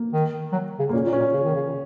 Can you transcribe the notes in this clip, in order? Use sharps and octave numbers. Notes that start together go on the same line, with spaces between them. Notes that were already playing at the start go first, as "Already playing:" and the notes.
Already playing: A#3
D#3
F#3
C#3
A#3
A#2 C#4
A#2
C#4
A#2
C#3
D#3
C#3